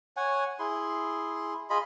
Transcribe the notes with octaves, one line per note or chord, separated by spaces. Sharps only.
C#5 F#5 G#5
E4 G#4 C6
F4 G#4 D#5 B5